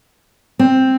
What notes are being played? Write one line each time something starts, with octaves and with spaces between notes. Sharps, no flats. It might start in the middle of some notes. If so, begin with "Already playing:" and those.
C4